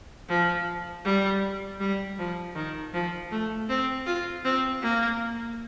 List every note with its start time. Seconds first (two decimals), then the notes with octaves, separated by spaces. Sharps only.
0.29 F3
1.05 G3
1.80 G3
2.18 F3
2.55 D#3
2.94 F3
3.31 A3
3.69 C4
4.06 F4
4.45 C4
4.82 A#3